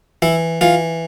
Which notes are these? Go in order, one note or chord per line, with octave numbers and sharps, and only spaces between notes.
E3 E4
E3 F4